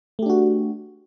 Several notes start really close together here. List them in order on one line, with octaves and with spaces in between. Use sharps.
A3 G4 D4 F#4